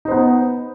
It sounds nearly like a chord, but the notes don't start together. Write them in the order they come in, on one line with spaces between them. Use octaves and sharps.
D#4 C5 B3